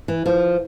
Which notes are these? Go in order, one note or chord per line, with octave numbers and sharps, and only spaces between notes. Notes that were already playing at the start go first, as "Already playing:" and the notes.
E3
F3